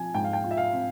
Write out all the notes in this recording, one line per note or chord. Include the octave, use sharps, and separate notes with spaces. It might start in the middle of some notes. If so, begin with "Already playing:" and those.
Already playing: F3 C4 G#5
G#2 G5
F5
G5
F4
E5
F5
C4